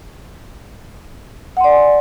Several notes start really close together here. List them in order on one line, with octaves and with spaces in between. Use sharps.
F#5 C6 D5 G#5